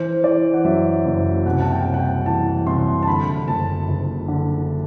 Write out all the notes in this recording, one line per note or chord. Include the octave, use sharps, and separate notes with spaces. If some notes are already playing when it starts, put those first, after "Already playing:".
Already playing: E3 C5
E3 D5
F#5
F#2 E5
F#1
C2 F#5
A5
G5
C2
F#5
G5
E3 A5
C2 C6
A5
D3 B5
F#1 A5
F#1
D3